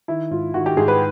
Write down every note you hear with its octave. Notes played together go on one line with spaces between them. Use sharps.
D#3 E4
G#2 F4
D#3 F#4
G4
G#2 G#4
B4